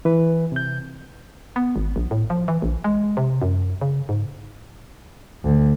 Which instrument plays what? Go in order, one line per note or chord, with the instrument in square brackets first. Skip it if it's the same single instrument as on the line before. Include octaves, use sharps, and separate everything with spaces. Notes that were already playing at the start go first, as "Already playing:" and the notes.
[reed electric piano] E3 B4
C3 G6
[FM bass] B3
G#1
A#1
A2
F3
E3
A#1
G#3
C3
F#2
C#3
G#2
[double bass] D2